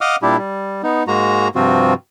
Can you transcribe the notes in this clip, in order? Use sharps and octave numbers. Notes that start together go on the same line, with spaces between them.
D#5 F5 F#5 D6 D#6 F6
A#2 G3 D4 E4 G4
G3
B3 D#4
G#2 G#3 A#3 F#4 A#5
G2 C3 F3 C4 F4 F#4